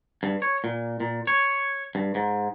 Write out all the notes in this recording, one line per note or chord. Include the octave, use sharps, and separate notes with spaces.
G2
C#5
A#2
A#2
C#5
G2
G#2